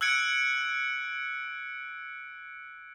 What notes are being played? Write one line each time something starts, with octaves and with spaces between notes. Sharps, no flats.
E6 F#6 G#6 C#7 D7